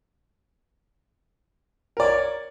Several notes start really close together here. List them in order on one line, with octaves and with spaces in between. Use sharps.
A#4 D5 C#5